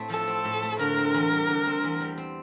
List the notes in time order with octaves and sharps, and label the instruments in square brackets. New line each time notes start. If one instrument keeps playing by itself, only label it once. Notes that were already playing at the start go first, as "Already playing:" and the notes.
Already playing: [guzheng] A2 A3 C4
[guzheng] F3 [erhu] A4
[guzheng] C4
A2
A3
[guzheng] D3 [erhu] A#4
[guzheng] C4
E2
G3
D3
C4
E2
G3
C4